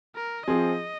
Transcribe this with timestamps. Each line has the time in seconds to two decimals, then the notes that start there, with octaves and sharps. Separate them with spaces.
0.16 A#4
0.47 F3 C4 G#4 D#5